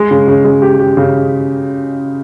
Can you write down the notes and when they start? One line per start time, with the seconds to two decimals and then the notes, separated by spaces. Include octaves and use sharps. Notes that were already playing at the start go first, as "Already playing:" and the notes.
Already playing: G#3
0.11 C#3
0.27 C#3
0.45 G#3
0.62 G4
0.79 G4
0.97 C#3